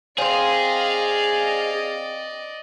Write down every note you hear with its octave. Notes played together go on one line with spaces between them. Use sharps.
C4 G#4 C5 D5 D#5 F5